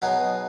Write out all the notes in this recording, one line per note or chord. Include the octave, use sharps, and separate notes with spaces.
B2 F#3 B3 D#4 G#4